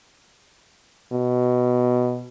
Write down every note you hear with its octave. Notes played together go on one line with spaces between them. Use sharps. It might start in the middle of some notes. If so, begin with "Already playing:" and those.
B2